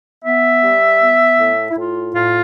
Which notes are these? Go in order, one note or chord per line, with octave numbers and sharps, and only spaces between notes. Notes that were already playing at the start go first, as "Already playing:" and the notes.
B3 E5
G3
B3
A2
E4
A2 F4
A2 F4